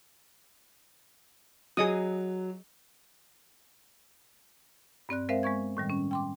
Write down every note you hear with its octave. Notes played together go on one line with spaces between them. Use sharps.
F#3 G#4 D#5 D#6
G2 C4 D5 F#6
G#3 C4 A#4 C5 E5 F5
G#3 B3 C#6 G#6
A2 D#3 G3
C#4
G5 C6 D6